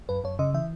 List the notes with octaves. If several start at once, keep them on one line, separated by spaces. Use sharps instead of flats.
F#2 B4
F#2 C#5
C#3 D#5
E3 E5